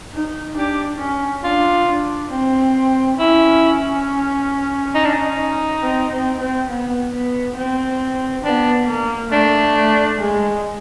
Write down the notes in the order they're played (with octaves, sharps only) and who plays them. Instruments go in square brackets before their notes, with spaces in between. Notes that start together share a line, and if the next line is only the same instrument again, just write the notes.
[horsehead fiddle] D#4
[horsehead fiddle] D4 [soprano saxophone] G4
[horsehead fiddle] C#4
[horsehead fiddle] D4 [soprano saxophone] F4
[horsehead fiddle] D4
C4
[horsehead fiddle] C#4 [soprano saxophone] E4
[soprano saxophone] D#4
D4
D#4
[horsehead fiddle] C4
C4
C4
B3
B3
C4
[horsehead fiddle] B3 [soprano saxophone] D4
[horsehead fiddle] A#3
[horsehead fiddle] A3 [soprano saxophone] D4
[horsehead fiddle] A3
G#3